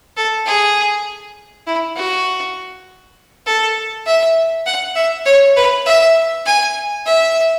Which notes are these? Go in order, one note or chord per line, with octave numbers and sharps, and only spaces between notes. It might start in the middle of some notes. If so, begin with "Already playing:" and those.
A4
G#4
E4
F#4
A4
E5
F#5
E5
C#5
B4
E5
G#5
E5